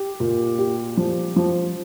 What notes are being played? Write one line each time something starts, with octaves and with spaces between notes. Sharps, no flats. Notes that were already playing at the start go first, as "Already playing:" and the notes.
Already playing: G4
A#2
G4
F3
F3